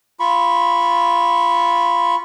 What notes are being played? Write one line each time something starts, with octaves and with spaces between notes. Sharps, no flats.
F4 B5 C#6